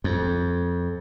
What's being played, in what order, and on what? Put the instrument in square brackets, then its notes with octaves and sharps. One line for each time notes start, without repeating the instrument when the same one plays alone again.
[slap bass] F2